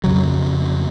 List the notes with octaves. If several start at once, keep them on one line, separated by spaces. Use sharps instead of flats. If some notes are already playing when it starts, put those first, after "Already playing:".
F2 C#3 F#3